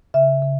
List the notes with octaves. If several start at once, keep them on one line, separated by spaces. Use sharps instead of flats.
C#3 E5
C#3